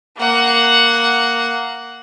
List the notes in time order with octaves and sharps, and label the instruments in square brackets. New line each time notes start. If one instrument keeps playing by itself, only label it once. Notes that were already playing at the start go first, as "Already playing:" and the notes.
[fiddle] A#3 F#5